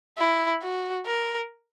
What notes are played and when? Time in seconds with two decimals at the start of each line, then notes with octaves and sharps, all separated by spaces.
0.19 E4
0.63 F#4
1.06 A#4